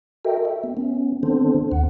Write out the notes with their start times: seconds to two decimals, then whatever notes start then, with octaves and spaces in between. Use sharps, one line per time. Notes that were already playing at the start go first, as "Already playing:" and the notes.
0.25 F#4 A4 A#4 D#5 E5 G5
0.45 E5
0.64 B3
0.77 B3 C#4
1.23 D#3 B3 C4 D4 A4 C5
1.72 D#2 F#5